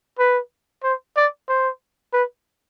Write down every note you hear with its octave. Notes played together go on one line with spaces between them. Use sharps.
B4
C5
D5
C5
B4